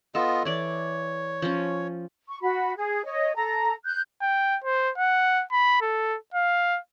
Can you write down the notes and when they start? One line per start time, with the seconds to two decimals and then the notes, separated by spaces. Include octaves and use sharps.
0.15 B3 F4 A4 D#5
0.45 E3 C#5 D5
1.42 F3 C#4
2.28 C#6
2.41 F#4 B5
2.77 G#4
3.04 C#5 D#5
3.35 A4 A#5
3.85 F#6 G6
4.22 G5
4.65 C5
4.98 F#5
5.52 B5
5.82 A4
6.34 F5